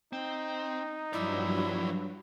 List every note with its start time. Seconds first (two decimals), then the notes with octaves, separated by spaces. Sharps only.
0.13 C4 D#4
1.13 G2 F3 F#3 E4 D5